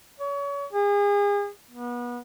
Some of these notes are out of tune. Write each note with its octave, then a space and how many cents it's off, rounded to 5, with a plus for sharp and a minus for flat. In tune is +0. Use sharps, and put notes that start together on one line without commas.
C#5 +30
G#4 -35
B3 -30